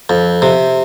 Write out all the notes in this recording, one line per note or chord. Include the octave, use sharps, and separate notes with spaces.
F2
C3